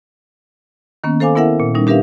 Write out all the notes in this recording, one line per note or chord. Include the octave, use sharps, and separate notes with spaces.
D#3 A#3 B3 C#4
A4 C5 F5 G#5 D6
B3 E4 A#4 E5 F#5
A#2
G3 C#4 D#4
D4 G4 A#4 B4 E5 F5